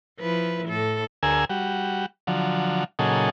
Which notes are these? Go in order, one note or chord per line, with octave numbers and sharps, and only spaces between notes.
F3 E4 B4
A2 A4
D2 G#4 A#4 G#5 E6
G3 F#4
D3 F3 F#3
A#2 C#3 F#3 D#4 G#4 A4